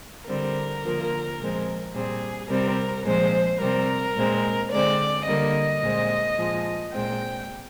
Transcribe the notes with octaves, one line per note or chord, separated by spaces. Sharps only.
D3 G3 C4 A#4
D3 F3 A#3
A#2 F3 G#3 C4
A#2 G3 C4 G#4
C3 G3 C4 A#4
A#2 F3 G#3 C4 C5
C3 G3 C4 A#4
A#2 G#3 C4
D3 G#3 C4 D5
D3 G3 A#3 D#5
A#2 G#3 C4
A#2 F3 G#3
A#2 G#3 C4 G5